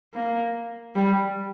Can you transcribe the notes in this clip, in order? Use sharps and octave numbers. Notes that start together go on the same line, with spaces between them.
A#3
G3